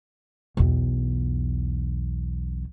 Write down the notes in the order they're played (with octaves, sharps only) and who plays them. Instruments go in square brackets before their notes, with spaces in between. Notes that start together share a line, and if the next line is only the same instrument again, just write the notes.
[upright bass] B1 E2